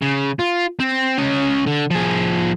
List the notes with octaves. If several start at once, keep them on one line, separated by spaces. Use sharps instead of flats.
C#3
F4
C4
C#4 D#5
D3
F3 G#4